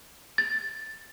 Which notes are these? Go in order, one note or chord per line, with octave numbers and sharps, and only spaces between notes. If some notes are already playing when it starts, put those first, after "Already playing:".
A6